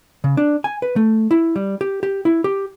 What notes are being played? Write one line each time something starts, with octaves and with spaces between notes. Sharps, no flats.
C#3
D4
G#5
B4
A3
E4
G3
G4
G4
E4
G4